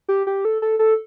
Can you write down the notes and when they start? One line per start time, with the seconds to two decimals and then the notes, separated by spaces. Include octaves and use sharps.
0.09 G4
0.27 G4
0.45 A4
0.62 A4
0.79 A4